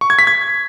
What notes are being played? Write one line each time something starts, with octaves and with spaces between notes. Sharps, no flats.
C#6
G#6
B6
G#6